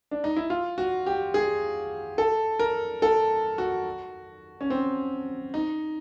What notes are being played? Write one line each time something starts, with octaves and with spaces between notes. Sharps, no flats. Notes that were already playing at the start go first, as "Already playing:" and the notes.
D4
D#4
E4
F4
F#4
G4
G#4
A4
A#4
A4
F#4
C#4
C4
D#4